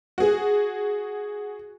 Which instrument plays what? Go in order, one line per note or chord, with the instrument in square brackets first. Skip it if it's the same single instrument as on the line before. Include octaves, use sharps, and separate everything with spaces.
[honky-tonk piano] F#4 G#4